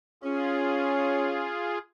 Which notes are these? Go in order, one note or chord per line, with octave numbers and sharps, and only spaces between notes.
C#4 F4 G#4